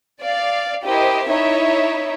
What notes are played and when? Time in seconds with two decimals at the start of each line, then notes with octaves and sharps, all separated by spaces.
0.21 D5 F5
0.85 E4 G4 A#4 C5 D#5
1.27 D#4 E4 C#5 E5